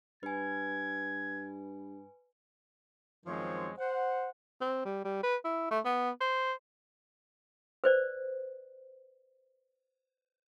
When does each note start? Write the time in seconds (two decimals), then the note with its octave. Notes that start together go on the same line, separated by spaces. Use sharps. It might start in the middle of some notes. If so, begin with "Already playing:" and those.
0.23 G2 B4 G#5 G#6
3.26 F#2 D#3 F3 G#3 C4 C#5
3.77 C5 F#5
4.61 C4
4.85 G3
5.05 G3
5.23 B4
5.45 E4
5.71 A3
5.85 B3
6.21 C5
7.84 B4 C5 D5